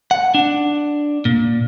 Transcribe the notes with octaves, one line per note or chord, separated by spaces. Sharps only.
F#5
D4
A#2